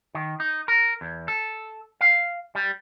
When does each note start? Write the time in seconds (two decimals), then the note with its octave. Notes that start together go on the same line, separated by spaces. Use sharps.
0.15 D#3
0.40 D#4
0.68 A#4
1.01 E2
1.28 A4
2.01 F5
2.55 G3